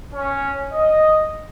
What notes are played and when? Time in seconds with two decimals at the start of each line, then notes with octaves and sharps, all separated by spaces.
0.14 C#4
0.72 D#5